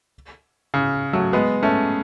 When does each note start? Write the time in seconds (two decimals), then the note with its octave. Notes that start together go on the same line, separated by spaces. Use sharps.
0.74 C#3
1.13 F#3 A3
1.33 G#3 B3
1.63 A3 C#4